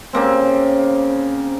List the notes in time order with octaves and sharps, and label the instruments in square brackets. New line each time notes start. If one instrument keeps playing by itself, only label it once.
[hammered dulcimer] C#3 A#3 C4